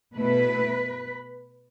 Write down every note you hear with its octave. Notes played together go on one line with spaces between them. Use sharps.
B2 A3 E4 B4